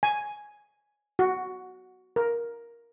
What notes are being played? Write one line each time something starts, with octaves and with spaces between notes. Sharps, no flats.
G#5
F#4
A#4